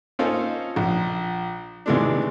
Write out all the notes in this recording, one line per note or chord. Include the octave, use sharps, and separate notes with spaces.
A#3 C#4 D#4 F4 A4 C5
A#1
D#2 C3 E3 G#3 A3 D4